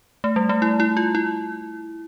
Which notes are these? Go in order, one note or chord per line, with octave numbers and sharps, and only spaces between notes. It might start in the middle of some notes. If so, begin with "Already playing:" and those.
A3
G3
A3
E4
E4
F4
E4